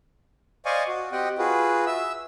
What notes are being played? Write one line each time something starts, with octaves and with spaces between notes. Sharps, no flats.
C5 D5 D#5 F5 G#5 C#6
F#4
C4 G4 D#5 F#5 G5
F4 F#4 G#4 B4
E5 E6